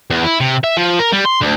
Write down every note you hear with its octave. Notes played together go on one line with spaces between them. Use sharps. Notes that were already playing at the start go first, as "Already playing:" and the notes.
E2
E4
C3
E5
F3
A#4
G3
C6
D2